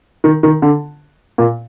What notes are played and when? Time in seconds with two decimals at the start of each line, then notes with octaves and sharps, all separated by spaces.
0.24 D#3
0.43 D#3
0.62 D3
1.38 A#2